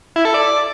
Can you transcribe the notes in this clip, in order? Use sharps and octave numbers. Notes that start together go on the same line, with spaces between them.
E4
A4
D5